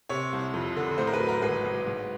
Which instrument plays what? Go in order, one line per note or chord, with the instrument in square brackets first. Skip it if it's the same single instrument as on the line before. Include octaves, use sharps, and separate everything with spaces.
[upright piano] C3 C#5
C2
F2
D3
A2 C5
A#4
B4
F#3
A#4
G#1 B4
G#1
G#2